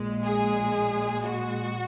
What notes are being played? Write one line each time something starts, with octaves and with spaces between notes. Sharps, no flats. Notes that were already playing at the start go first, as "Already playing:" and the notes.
Already playing: A#1 A#2 G#3
G#4
F#4